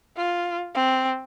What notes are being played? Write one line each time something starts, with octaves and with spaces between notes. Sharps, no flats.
F4
C4